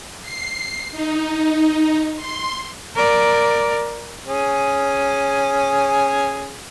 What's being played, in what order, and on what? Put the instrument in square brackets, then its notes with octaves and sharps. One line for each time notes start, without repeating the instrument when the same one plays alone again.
[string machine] C7
D#4
C6
[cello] A#4 D5
[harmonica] C#4 G#4